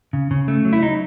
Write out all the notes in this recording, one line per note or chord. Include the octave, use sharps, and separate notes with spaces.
C#3
C#3
A3
F#3
E4
D#4